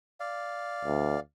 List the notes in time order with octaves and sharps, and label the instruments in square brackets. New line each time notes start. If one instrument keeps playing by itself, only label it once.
[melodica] D5 F5
[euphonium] D2